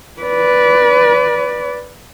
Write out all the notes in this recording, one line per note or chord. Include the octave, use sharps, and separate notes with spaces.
B4 D5